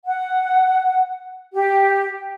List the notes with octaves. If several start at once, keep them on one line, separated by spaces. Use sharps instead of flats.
F#5
G4